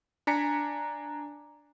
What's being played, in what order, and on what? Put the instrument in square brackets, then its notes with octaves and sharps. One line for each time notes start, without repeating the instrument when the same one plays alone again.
[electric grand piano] D4 G#5 A#5 B6 C#7